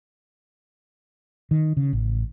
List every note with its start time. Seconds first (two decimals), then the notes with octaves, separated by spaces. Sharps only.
1.51 D#3
1.77 C#3
1.93 A1